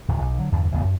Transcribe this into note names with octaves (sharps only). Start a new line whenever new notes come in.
D1 D2 D#3
B1
D3 F#3
E2 G2 D3 G3
A1 D#2 C#3 B3
F#2